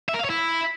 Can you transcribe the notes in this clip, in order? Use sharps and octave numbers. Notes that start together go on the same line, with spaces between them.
E5
A#4
F5
C#5
E4